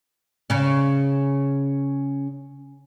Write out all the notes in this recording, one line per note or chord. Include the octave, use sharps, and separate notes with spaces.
C#3 C#4